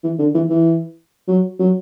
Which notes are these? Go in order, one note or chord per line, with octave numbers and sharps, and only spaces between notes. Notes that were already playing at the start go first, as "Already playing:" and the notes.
E3
D3
E3
E3
F#3
F#3